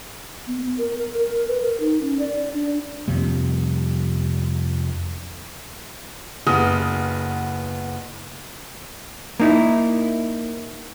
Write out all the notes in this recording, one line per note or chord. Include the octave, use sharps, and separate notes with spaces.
B3
B3
A#4
A#4
A#4
B4
A#4
D#4
C#4
D5
D4
D4
F2 C3 G3
F#1 B3 D#6 F6
A#3 D#4 E4